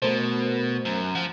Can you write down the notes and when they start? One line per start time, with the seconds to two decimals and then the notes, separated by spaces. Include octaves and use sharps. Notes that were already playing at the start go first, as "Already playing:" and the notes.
0.02 B2 A3 A#4 C5
0.85 F#2
1.15 F3 F#5